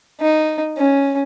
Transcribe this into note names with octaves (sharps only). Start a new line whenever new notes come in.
D#4
C#4